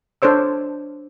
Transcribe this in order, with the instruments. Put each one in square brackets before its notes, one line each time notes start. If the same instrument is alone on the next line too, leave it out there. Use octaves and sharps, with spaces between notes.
[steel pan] D4 A4 C5 C#5 E6